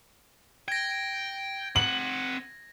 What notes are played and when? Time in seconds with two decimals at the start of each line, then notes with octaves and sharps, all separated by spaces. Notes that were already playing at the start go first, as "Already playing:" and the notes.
0.68 G5 G#6 A#6
1.76 C4 F#5 F#7